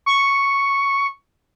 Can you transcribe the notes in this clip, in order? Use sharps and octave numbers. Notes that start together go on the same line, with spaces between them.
C#6